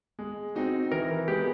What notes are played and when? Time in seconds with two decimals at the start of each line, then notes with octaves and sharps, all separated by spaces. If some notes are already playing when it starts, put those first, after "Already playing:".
0.19 G#3
0.55 C4 D#4 F#4
0.91 E3 A#4
1.28 G#3 B3 G4